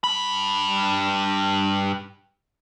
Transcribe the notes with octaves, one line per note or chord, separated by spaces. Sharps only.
G2 B5